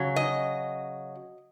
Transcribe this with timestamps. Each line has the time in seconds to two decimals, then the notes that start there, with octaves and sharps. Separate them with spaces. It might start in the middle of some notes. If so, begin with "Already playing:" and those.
Already playing: C#3 F#3
0.16 D#5